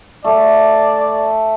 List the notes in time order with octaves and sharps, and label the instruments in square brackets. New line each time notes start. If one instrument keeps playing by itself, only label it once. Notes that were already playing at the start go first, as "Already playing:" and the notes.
[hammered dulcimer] A3 [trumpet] D5